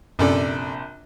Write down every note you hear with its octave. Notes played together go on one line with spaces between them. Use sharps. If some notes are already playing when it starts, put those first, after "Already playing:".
A#1 F#2 C3 C#4 A4 D5